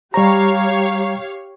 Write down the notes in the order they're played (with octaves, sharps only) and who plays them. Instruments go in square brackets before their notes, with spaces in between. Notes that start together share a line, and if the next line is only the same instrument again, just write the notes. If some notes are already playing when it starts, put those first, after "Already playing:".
[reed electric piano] G3 A#5 [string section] G4 C#5 F5